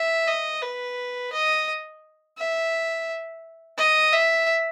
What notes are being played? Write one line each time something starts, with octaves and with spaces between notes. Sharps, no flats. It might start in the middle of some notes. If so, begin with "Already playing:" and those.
Already playing: E5
D#5
B4
D#5
E5
D#5
E5